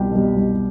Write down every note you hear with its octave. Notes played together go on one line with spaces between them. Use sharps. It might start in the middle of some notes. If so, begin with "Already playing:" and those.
Already playing: C2 B2 G3 G4
B2 G3
C2